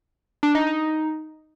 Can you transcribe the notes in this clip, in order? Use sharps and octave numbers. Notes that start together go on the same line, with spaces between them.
D4
D#4
D#4